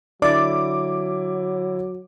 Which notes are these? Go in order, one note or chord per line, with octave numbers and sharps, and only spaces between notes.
D3 F#3 E4 D5 D6